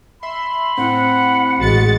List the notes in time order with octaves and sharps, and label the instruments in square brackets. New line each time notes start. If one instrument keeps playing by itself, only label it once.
[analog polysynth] E5 C6 [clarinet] B5
[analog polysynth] A2 A3 C4 [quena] F#5
[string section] A1 G#3 A6 [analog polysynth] F#4 C#7